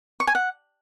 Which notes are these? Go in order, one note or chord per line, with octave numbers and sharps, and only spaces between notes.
C#6
G#5
F#5